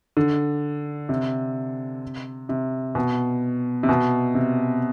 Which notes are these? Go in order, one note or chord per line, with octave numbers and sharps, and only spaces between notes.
D3
C3
C3
B2
C3
B2
C3